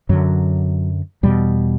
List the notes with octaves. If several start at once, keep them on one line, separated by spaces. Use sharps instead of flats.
F#2 D3 F#3
E2 B2 G3